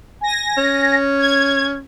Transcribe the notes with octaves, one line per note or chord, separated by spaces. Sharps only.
G#5 A#6
C#4
G#6